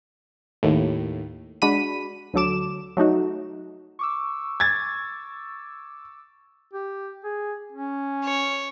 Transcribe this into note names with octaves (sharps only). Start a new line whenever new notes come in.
D#2 A2
G#3 D4 F#4 B5 B6 D#7
D2 D3 F#3 A4 D6 E7
F#3 A3 D#4 F#4
C#6 D6 E6
G#6 A6
G4
G#4
C#4
C#5